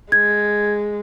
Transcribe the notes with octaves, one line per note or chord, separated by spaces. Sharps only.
G#3 G#6